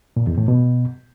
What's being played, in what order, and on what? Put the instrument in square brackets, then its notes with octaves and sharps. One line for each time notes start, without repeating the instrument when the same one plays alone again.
[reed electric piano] A#2
E2
A2
B2